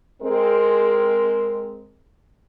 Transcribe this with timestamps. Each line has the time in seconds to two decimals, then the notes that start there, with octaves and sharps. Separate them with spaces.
0.22 G#3 C4 A#4